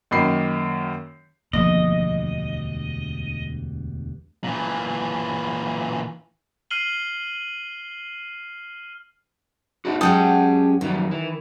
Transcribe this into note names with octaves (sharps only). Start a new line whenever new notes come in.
F#2 D#3 A#3 B5 C7
E1 D2 G2 F3 A#3 D#5
A#2 E3
F6 C7 D#7 F#7 G7
D4 D#4 F#4
F#2 G#3 C#4 G4 F#5 G5 A5 D#6
F2 D#3 F#3 G3
E3